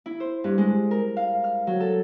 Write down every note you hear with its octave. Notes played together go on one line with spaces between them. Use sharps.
E4
C5
G2
G#3
A#4
F5
F6
F#3
A4